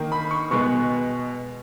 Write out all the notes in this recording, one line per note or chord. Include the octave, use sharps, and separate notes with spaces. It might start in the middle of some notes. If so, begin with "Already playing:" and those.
Already playing: D#3 A#3
B5
C#6
B2 G#3 B3 C#6